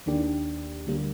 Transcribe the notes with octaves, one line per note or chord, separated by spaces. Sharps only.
D#2 D#3 A#3 D4 G4
D2 D3 G3 A#3